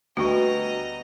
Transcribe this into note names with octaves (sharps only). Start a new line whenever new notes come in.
D2 B2 G3 F#4 D#5 A#5 C#6